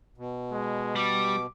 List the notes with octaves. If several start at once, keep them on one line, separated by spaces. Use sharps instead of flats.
B2
G#3
G3 D6